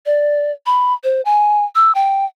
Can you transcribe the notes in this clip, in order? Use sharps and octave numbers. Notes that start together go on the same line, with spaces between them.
D5
B5
C5
G#5
E6
G5